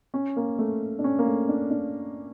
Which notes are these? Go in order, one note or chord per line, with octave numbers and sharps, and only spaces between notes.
C#4
A#3
A3
D4
C#4
A#3
A3
D4
D4